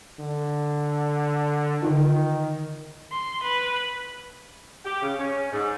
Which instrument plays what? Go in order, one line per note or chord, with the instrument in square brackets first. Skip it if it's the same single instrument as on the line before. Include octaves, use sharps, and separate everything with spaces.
[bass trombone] D3
[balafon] D3 D#4 F4 [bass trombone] D#3
[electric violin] C6
B4
[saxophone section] G4
C#3
C#4
G#2